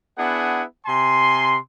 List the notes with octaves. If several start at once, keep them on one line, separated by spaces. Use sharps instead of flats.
B3 D4 E4 G#4 F#5
C3 G#5 C6